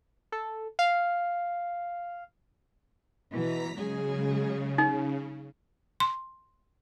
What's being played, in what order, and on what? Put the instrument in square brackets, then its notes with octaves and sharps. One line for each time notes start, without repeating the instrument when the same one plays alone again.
[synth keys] A4
F5
[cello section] B2 E3 [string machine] A#5 B6
[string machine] C#3 [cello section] F#3 G#3 G#4
[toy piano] D#4
[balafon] C6